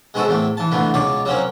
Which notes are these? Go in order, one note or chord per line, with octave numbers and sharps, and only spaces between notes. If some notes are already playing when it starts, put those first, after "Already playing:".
G#3 B3 C4 F#4 G#4 A4
E2 A2 A3 C4
E3 A5
A#2 D3 E3 A3 B3
C#2 B2 C#5 D5 D6
F#3 A#3 C4 C#4